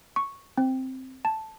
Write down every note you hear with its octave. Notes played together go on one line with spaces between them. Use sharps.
C#6
C4
A5